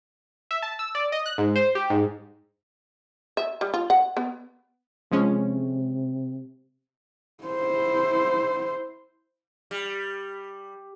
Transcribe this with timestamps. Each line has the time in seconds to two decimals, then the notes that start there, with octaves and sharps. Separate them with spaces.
0.51 E5
0.62 A5
0.79 E6
0.95 D5
1.12 D#5
1.26 F#6
1.38 G#2
1.56 C5
1.75 G4
1.90 G#2
3.37 E5
3.61 G3
3.74 F4
3.90 F#5
4.17 B3
5.11 C3 F3 G#3 C#4
7.44 E4 C5
9.71 G3